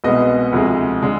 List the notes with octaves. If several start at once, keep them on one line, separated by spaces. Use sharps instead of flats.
C2 B2 G#3 B3 D#5
D2 C3 F3 G#3
D3 G#3